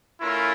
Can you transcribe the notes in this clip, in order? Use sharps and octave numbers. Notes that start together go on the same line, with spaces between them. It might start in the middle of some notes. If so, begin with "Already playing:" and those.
A3 C#4 E4 F4 A#4